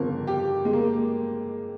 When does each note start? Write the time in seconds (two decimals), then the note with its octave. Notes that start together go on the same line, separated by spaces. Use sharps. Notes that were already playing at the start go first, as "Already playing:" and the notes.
Already playing: G1 F2 C#3 F3 A#4
0.27 G4
0.65 G#3
0.73 A#3